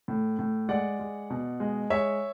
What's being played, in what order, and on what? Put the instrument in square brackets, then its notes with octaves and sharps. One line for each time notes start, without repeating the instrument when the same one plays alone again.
[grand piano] A2
A2
G#3 D5 F#5
G#3
B2
G#3
G#3 C#5 E5